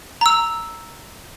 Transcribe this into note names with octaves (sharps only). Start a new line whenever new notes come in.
A#5 E6